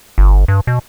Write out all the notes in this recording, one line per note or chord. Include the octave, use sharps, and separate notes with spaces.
G1
G2
B2